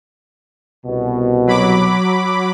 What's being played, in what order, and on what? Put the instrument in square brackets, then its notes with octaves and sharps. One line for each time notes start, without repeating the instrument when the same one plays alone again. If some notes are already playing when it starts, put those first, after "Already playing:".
[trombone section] C2 B2
[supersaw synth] F#3 B5 D6